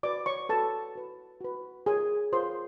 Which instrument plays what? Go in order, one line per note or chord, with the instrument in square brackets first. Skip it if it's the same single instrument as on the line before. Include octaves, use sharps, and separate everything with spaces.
[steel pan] F#4 B4 D5 D6
C#5 C#6
F#4 A4 B4 A5
F#4 B4
F#4 B4
F4 G#4 A#4 C#5 G#5
F4 A#4 C5 C#5 C6